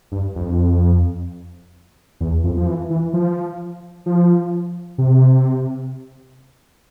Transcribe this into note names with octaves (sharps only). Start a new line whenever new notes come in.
G2
F2
E2
F2
F3
E3
E3
F3
F3
C3